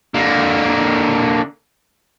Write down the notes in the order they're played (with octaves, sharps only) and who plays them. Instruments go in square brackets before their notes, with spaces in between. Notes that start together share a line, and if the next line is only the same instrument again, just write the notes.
[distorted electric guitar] D3 A#3